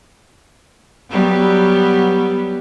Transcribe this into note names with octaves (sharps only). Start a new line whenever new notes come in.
F#3 G3 B3